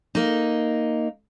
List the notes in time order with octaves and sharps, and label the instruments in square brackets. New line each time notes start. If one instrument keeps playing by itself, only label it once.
[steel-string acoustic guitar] A#3 D#4